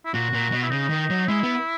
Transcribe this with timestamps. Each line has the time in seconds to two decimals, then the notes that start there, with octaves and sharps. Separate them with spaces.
0.05 E4
0.14 A#2 F#4
0.33 A#2
0.52 B2
0.62 E4
0.71 C#3 D#4
0.90 D#3
1.10 F#3
1.28 G#3 E4
1.43 B3